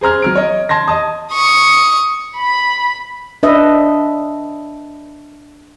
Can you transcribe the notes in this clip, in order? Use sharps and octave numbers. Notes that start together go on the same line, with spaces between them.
G#4 C5 A#5 F6 G#6
F#3 F6 D7
C#5 D#5
A5 C6 G#6 A#6
D#5 A5 D#6
C#6 D#6
B5
D4 B4 D#5 E5